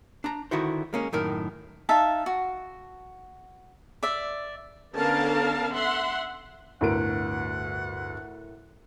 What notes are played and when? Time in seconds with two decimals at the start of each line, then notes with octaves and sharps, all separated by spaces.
0.24 D4 A#5
0.51 D3 D#3 E4 F#4 C5
0.93 G#3 A#3 C#4
1.13 F#2 A2 D#3 A#4
1.89 D#4 E5 F5 A5
2.26 F#4
4.03 D5 E5
4.95 D3 B3 C#4 A#4 F5 A5
5.73 E5 F#5 C6
6.81 G1 D2 A2 A#4 F#5 D7